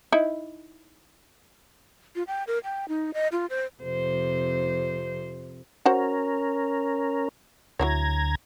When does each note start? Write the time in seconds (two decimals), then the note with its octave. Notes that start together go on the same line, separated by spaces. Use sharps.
0.12 D#4 E4
2.16 F4
2.27 G5
2.47 A#4
2.64 G5
2.89 D#4
3.14 D#5
3.32 F4
3.50 C5
3.84 F2 C3 C5
5.86 C#4 F#4 A#4 C5 F#5
7.79 D2 F#3 E4 C#5 A#5 G#6